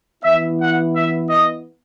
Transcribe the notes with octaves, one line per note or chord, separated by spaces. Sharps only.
E3 B3 E4 E5
F#5
E5
D#5